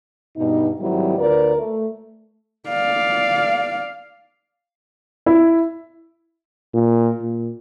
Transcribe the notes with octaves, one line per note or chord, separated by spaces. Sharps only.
G2 B2 D#4
G#2 D#3 F#3 G3 C4 E4
D2 D3 F4 A#4 B4 D5
A3
D5 F5
E4
A#2
A#2